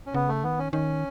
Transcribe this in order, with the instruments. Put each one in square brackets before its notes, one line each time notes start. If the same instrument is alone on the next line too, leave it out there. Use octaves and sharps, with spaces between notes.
[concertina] C#4
[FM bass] C#3 [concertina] B3
[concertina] A3
[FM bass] D#3 [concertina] B3
[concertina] C#4
[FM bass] D#3 [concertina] C#4